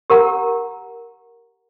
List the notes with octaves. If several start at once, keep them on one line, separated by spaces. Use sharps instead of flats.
G4 A#4 F#5 A#5